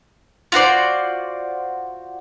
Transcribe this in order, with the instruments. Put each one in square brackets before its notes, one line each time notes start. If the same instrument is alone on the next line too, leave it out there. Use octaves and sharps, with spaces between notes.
[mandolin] F4 F#4 C5 D5